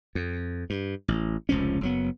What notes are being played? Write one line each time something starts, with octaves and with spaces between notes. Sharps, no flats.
F2
G2
A1
F1 C#2 F3 C#4
F#1 F#3 B3